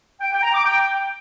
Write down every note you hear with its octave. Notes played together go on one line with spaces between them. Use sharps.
G5
G5
A#5
D6
G5